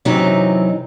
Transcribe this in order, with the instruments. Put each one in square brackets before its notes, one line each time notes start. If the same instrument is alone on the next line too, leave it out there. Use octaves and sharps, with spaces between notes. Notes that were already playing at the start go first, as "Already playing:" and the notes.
[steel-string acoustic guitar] F#2 C3 E3 F#3 C4 D#4